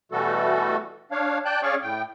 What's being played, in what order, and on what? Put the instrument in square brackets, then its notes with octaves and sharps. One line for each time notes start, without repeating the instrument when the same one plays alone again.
[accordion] B2 E3 G3 A3 F#4 A4
D4 C#5 F5
D5 G5 A5 F#6 G6
C#4 G#4 C#5 D5 F5 C#6
A2 G5